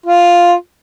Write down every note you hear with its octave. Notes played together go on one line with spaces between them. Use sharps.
F4